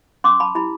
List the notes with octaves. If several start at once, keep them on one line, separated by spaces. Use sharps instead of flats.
C#4 C6 D6
A5 B5
E4 G4 A5 B5